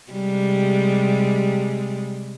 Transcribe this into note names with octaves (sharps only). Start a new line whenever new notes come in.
C3 G3 G#3